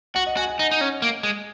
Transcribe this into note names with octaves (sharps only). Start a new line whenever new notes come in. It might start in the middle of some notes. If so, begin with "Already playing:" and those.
F#4 F#5
D#5
F#4 G#5
F#5
D#4 D#5
D#4
C#4
A#3
G#3